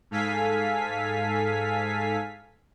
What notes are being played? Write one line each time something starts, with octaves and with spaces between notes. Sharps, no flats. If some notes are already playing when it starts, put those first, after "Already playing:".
G#2 A4 F5 G#5 B6